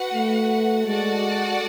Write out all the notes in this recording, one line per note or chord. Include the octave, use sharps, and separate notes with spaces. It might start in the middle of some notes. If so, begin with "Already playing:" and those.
Already playing: F#4 B4 F#5
A3
G#3 F#4 A4 D5 F#5